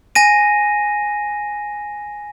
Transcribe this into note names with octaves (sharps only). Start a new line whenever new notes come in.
G#5 A#6 D#7